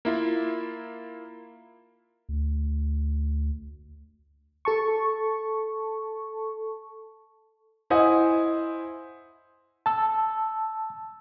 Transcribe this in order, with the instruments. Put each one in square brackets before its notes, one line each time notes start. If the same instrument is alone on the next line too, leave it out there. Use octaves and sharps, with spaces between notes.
[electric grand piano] A#3 E4 F4
[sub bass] D2
[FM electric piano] A4 A5 C#6
[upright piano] E4 C5 D#5 F#5 G#5 D#6
[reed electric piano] A5 E6